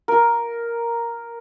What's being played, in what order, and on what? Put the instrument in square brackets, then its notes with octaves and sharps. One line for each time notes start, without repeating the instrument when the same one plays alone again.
[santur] A#4